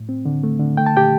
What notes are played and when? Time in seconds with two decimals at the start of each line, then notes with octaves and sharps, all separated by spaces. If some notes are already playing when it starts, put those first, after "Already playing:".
Already playing: A2
0.09 C4
0.25 D3
0.43 A3
0.60 D3
0.77 A3 G5
0.86 A5
0.96 A#2 G4 G5